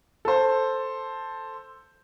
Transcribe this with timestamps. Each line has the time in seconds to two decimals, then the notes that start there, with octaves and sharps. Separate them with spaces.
0.25 A4 C5